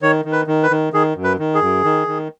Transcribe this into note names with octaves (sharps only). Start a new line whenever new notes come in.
D#3 C#5
D#3
B4
D#3
B4
D#3
D#3 G#4
F#2
B4
D#3
G#4
F#2
D#3
D#3